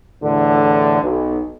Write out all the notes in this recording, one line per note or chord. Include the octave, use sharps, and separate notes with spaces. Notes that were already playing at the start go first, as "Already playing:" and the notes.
E2 A2 D3
B1